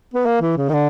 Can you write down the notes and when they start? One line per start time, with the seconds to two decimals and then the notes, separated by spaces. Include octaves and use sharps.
0.14 B3
0.25 A#3
0.41 E3
0.57 C#3
0.69 D#3
0.73 D3